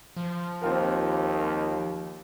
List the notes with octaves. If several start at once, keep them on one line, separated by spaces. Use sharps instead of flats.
F3
D#2 C4 F4 A#4